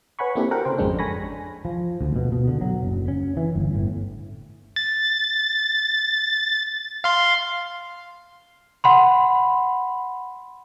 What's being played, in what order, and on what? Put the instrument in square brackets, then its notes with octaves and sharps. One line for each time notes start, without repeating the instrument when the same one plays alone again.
[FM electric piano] B4 C#5 F#5 G#5 B5 C#6
A#3 C4 D4 E4 G4 A4
F#4 A4 A#4 F#5 G5
C#3 C5 G5
G#1 F2 G#3 C#4 D4 A4
G#5 B5 C#6 A#6
[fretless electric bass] F3
D2
B2
B2
D3
F#3
F#1
C#4
E3
G1
A2
[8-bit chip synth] A6
F5 C6
[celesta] F#5 B5 C6